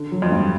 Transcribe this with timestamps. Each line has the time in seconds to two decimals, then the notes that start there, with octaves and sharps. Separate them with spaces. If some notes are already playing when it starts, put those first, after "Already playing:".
Already playing: D3
0.12 F#3
0.22 F2
0.32 G2